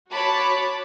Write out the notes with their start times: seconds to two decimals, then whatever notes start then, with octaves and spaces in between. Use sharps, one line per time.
0.12 F#4 C#5 A5 B5 D6